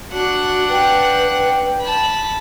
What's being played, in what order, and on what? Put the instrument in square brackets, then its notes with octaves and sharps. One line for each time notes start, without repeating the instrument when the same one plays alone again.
[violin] D4 F#5 [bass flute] F#4
[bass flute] B4 [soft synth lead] G5
[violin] A5 B5